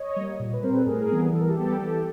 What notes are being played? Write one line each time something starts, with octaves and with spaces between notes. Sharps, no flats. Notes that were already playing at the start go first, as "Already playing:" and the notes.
Already playing: C#5 D#5
G3 A#3
A#2
B4
G3 C4 A#4 C5
A4 B4
A2 G#4 A#4
E3 G3 B3
E3 A4
A#4
G4 A4
G3 B3
E3